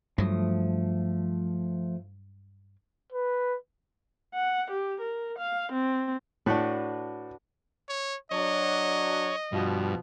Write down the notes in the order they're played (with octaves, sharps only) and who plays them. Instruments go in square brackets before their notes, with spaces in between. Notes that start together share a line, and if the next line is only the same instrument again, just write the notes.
[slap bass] G2 F#3 [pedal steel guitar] F3 A3 D#6
[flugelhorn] B4
[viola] F#5
G4
A#4
F5
C4
[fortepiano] A2 [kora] D4 F#4 B4
[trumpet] C#5
[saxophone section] F#3 D4 [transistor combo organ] C#5 [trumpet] D#5
[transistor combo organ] G2 [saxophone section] B2 F3